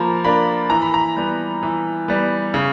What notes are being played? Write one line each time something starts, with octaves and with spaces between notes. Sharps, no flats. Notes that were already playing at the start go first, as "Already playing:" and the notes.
Already playing: F3 A#3 A#5 B5
A#3 D4 B5
E3 A#5
B5
A#5
G3 B3
E3
G3 B3
C#3